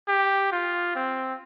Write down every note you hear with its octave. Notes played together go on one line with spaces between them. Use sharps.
G4
F4
C4